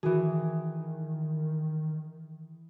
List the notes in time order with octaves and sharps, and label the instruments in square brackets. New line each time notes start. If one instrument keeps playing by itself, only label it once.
[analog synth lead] D#3 [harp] E3 G#4 [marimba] F#4